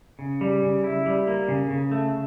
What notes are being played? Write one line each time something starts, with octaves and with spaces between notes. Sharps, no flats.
C#3
G3
C#3
E4
G3
A#3
C#3
C#3
A3